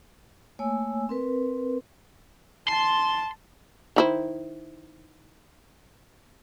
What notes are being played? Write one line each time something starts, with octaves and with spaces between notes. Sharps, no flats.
A3 A#3 C#5 G#5 E6
C4 A#4 B4
A5 C6
D#3 E4 C5